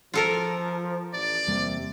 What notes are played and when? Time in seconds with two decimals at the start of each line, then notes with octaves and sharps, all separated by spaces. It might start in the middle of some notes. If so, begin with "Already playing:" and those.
0.14 F3 F4 A4 A#4
1.13 A1 D5
1.48 E2 C3 G3 A#3